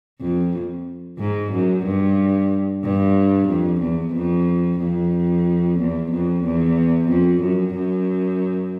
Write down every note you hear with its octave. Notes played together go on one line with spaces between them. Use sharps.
F2
G#2
F#2
G2
G2
F2
E2
F2
F2
E2
F2
E2
F2
F#2
F#2